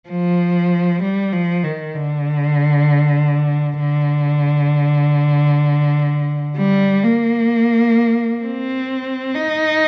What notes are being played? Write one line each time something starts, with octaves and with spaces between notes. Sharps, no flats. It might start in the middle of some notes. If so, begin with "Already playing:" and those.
F3
G3
F3
D#3
D3
D3
G3
A#3
C4
D#4